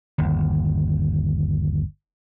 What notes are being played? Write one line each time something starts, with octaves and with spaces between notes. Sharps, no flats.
G1 D#2